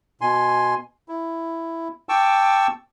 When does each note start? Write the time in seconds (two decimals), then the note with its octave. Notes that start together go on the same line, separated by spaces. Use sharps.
0.21 B2 G#5 C6
1.09 E4
2.09 G5 A5 C#6 D6 E6